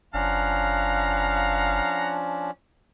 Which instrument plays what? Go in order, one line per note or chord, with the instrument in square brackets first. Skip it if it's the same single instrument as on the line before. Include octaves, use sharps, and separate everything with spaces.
[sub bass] F#1 [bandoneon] F3 C#4 D4 [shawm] F5 [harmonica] F#5 A#5